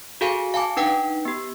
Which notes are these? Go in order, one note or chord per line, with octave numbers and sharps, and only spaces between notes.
F#4 G#4 A4 F5 G#5
F5 G#5 A5 D6
D4 D#4 B4 F#5 G5
B3 G4